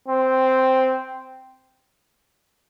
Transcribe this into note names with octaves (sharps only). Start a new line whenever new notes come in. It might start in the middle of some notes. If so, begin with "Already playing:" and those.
C4